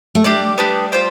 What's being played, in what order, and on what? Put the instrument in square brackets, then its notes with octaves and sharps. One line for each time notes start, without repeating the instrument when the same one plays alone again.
[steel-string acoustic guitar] A3
[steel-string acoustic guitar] G3 [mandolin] D4 G4 D5
[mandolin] B3 D4 G4
F4 C5 G5